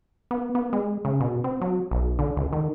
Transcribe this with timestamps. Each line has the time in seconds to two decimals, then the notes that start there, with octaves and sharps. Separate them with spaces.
0.31 B3
0.55 B3
0.73 G#3
1.05 C#3
1.20 B2
1.44 C4
1.61 F#3
1.91 B1
2.19 D3
2.36 C#2
2.53 D#3